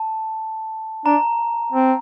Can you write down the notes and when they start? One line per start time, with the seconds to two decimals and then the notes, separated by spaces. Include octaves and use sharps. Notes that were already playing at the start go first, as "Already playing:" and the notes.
Already playing: A5
1.06 D4 A#5
1.73 C4